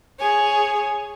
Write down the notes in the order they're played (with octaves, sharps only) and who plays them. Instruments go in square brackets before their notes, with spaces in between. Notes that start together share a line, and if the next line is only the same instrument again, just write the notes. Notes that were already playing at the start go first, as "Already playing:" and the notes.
[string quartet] G#4 C#5 G#5